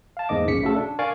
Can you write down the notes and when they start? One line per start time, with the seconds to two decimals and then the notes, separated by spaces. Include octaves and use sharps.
0.17 F5 A5
0.29 E2 G#2 A#3 D#5 D6
0.47 A#1 C#3 B6 C#7
0.63 C#3 A3 F#4 A4
0.76 D4
0.99 A#4 D5 F5 G#5 C#6 D6